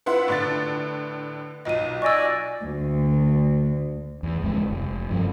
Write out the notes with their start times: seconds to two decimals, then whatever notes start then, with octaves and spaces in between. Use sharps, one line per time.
0.06 E4 F4 B4 F#5 C6
0.28 A2 D3 A6
1.65 B1 A#2 D#5 D#7
2.02 D5 D#5 G#5 C#6 E6
2.63 D2
4.23 E2
4.42 D1 F2 G#3
4.71 F1
5.09 G2 E3 F3